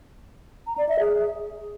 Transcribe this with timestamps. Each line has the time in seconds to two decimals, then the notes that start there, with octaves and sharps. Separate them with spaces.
0.67 A#5
0.78 D5
0.89 E5
1.00 G#4